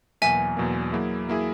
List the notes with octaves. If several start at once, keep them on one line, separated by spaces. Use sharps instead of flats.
E2 B2 F#3 A#3 E5 G#5
E2 B2 F#3 A#3
F#3 A#3 E4 G#4
F#3 A#3 E4 G#4